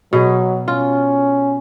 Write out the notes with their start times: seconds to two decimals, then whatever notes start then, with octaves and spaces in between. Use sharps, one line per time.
0.13 B2 F#3 G#4
0.68 C#4 F4